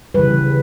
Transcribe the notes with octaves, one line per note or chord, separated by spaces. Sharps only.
C#3 E3 G3 B4